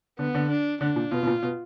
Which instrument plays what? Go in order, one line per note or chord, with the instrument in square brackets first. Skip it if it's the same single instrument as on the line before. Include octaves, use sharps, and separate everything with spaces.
[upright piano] D3 [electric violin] B3
[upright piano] D3
[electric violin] D4
[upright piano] D3 [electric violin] D4
[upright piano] A#2
[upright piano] B2 [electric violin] F4
[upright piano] B2
A#2
B2